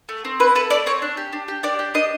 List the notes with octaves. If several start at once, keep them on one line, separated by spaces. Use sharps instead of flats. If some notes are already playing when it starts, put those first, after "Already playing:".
A3
C4
E4 B4
A4 B4
A3 D5
C4 C#5
D4
G4
D4
G4
D4 D5
G4
D4 D#5